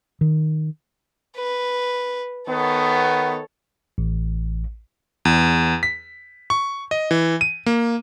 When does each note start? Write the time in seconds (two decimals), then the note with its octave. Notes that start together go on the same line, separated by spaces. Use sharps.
0.21 D#3
1.36 B4
2.48 D#3 B3 A4 C#5
3.98 A1
5.25 E2
5.83 B6
6.50 C#6
6.91 D#5
7.11 E3
7.41 D#7
7.66 A#3